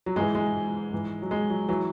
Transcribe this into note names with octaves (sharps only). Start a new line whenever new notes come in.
F#3
G#2 E3 G#3
G#3
G#2 E3
F#3
G#3
F#3
E3 F#3